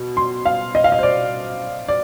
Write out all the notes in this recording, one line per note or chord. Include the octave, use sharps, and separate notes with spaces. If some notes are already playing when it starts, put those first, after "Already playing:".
Already playing: B2
C6
F5
D#5
F5
D#5
C5
D5
D5